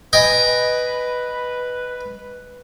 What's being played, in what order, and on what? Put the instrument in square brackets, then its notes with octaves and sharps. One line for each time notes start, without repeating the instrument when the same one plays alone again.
[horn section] B4 [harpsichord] D#5 G5 G#5